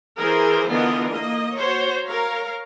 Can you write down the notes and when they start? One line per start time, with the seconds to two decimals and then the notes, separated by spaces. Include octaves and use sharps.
0.19 E3 G#4 A#4 C5
0.69 D3 E3 B3 F4 A#4 D#5
1.12 A#3 D#5
1.59 F#4 C5 C#5
2.04 A#4 C#5 F5 A#5